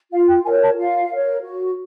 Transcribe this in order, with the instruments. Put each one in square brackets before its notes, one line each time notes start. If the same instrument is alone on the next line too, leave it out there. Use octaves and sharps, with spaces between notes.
[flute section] F4 F5
G5
A#4 C#5 G#5
A5
F4 F5
A#4 C#5
F#4